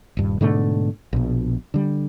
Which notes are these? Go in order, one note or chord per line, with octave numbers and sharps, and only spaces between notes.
D#1 G2
G#2 B2 D3 A3
A#1 B2
D3 G3